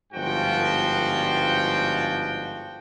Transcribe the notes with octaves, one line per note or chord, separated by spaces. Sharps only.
G1 G#2 F3 F#4 G5